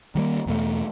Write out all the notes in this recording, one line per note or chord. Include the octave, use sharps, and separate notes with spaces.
D#3 G3 A#3
E2 B2 A3